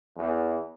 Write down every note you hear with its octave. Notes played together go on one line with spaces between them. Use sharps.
E2